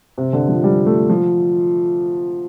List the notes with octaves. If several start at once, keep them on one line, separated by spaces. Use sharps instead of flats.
C3
D3
F3
G3
A3
F3